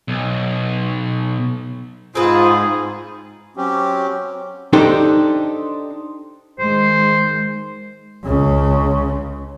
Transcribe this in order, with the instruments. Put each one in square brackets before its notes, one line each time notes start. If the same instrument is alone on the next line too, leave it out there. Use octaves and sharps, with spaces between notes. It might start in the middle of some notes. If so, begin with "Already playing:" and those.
[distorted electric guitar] B1
[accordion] G#2 [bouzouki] C4 B4 [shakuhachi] F4 [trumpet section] G#4
[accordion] F#3 C4 C#4 G4
[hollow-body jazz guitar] D4 D#4 G4 A4 C5
[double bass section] D#3 G#3 [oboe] C5
[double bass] C#2 C#3